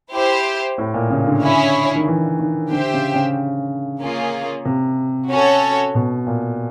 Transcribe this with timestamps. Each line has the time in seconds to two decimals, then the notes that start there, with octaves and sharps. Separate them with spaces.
0.13 E4 G4 C5
0.78 A2
0.94 A#2
1.10 C#3
1.27 D3
1.42 D3 C#4 E4 G#4 C#5
1.96 D#3
2.08 E3
2.39 D#3
2.71 D3 G4 C5 E5 G5
2.94 C#3
3.15 C#3
4.01 A#3 C#4 F4 G#4
4.65 C3
5.31 C#4 F#4 A4 C#5
5.95 B2
6.27 A#2